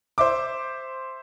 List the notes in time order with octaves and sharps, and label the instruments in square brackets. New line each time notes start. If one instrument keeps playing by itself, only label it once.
[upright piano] C5 E5 D6